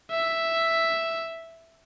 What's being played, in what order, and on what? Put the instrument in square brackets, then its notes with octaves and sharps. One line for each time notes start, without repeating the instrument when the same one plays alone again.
[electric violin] E5